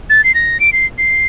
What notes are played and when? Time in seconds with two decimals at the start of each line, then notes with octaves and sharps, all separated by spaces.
0.10 A6
0.24 C7
0.35 A#6
0.60 D7
0.73 C7
0.98 C7